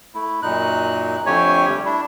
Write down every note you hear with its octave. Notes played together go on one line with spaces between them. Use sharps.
A3 E4
F#2 A#2 D#4 F#6
F2 D3 A3 G4 C#5 G#5
G3 A3
D4 E4